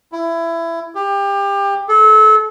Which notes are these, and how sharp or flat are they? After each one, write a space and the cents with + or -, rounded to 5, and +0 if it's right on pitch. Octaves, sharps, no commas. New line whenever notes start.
E4 +20
G4 +25
A4 -30